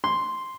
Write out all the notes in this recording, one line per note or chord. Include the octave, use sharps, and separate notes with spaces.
C6